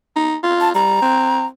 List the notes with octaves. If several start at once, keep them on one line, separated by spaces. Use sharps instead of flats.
D#4
F4
A5
G3 A#5
C4